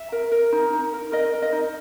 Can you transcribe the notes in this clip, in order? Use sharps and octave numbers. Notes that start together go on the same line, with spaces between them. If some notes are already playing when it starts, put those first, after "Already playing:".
Already playing: E5
A#4
A#4
D#4
D#4
A#4
A#4 D#5
A#4
D#5
D#4